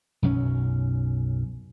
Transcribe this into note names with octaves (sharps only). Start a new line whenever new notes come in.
B1 F#2 G3 C#4